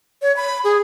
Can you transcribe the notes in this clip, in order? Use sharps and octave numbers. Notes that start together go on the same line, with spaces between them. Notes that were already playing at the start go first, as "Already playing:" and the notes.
C#5
B5
G#4